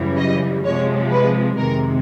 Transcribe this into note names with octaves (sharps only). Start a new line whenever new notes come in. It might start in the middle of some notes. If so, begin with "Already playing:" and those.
Already playing: F#2 C#3 E3 G3
D#5
C3 F3 G#3 C#5
B4
F2 C3 D#3 G#3 A#4